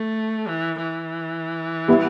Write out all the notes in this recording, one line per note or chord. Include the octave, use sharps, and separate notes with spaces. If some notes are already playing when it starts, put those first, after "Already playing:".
Already playing: A3
E3
E3
G3 B3 E4